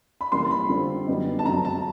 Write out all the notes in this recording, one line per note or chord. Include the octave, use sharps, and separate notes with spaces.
B5
C3 E3 G3 A#3 C#4 C6
B5
D3 G3 C4 F4 A4
F#2 D3 G3 B3 D#4
A5
F2 D3 F#3 A3 A#5
A5